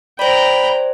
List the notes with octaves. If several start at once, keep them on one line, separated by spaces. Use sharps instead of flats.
C5 D5 G5 A#5 B5